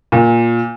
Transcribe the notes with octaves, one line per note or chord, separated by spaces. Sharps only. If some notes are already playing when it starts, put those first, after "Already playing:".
A#2